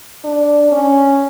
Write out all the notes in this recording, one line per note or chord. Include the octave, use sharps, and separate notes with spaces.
D4
C#4